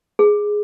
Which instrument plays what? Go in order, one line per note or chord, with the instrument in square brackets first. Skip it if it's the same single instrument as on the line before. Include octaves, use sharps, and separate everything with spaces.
[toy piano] G#4